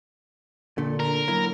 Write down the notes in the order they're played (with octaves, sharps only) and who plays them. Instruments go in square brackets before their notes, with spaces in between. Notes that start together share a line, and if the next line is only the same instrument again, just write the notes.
[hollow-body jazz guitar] A#2 A3 [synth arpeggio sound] D3
[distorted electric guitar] A#4
[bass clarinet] F#3 [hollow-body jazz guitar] A#3 E4